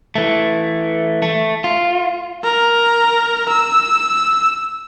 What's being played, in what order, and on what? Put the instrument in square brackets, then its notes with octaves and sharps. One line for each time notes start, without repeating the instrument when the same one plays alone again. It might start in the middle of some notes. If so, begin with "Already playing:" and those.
[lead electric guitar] E3 A3
A3
F4
[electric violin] A#4
E6